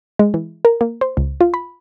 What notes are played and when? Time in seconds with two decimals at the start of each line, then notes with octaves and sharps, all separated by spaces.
0.19 G#3
0.34 E3
0.65 A#4
0.81 A#3
1.01 C5
1.17 C#2
1.41 F4
1.54 B5